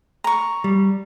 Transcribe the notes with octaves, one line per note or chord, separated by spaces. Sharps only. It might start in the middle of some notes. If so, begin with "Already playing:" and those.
A#5 C#6
G3